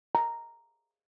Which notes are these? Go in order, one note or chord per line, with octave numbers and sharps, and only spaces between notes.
A#5